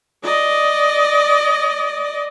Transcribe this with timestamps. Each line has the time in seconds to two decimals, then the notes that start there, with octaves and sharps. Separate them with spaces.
0.24 D5 D#5